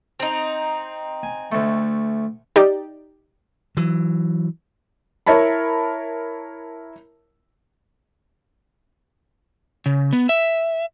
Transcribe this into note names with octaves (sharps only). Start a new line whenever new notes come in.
C4 D#4
G#5
D2 A3
D#4 G4 D5
E3 F#3
E4 A#4 C#5 A5 B5
C#3
B3
E5